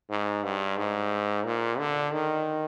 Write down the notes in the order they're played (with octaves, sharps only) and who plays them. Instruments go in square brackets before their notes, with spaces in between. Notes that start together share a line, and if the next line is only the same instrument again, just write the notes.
[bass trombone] G#2
G2
G#2
A#2
D3
D#3